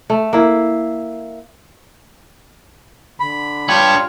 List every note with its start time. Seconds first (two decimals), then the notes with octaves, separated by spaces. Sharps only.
0.10 A3
0.33 A#3 E4
3.20 D3 B5
3.69 D4 F4 G4 C#5